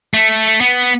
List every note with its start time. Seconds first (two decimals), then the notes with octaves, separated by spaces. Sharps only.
0.14 A3
0.61 B3